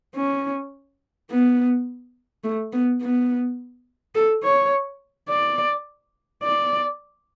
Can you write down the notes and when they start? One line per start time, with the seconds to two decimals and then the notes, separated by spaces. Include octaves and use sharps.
0.16 C#4
1.30 B3
2.44 A3
2.73 B3
3.01 B3
4.15 A4
4.43 C#5
5.29 D5
6.43 D5